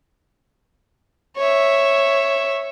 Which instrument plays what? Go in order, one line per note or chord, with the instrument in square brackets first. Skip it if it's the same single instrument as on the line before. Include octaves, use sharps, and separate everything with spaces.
[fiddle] C#5 E5